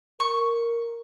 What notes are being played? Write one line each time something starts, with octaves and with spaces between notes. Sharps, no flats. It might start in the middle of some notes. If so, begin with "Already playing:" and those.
A#4 C#6